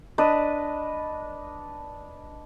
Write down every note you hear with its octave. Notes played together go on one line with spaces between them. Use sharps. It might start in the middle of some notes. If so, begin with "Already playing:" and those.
D4 B4 D#5